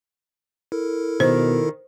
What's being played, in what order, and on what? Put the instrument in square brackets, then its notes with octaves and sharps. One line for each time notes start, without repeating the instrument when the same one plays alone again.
[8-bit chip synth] E4 A4 A#4
[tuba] B2 [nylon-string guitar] D#3 [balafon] C5